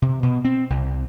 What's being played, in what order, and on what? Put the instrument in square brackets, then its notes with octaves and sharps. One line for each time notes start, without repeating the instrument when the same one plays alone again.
[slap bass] C3
B2
C4
C2